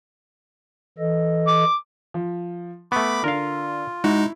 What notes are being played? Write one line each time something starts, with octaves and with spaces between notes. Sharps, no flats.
E3 A4 D#5
D6
F3
A3 B3 B5 C#6 D6
D3 F4 A#4 F5
G#3 D#4 E4 F#4